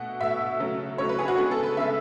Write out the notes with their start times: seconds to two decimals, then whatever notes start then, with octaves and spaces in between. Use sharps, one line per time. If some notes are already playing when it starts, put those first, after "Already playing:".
Already playing: B2 A3 F#5
0.21 B2 A3 E5
0.59 C#3 F#3 A3
0.98 C#3 F#3 A3 C#5
1.09 B4
1.19 G#4
1.28 F#4
1.38 C#3 G#3 B3 G#4
1.51 A4
1.64 B4
1.77 C#3 G#3 B3 E5